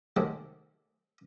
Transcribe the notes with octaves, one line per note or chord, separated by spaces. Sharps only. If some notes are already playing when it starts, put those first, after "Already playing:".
C3 D#3 F#3 G#3 A3 C4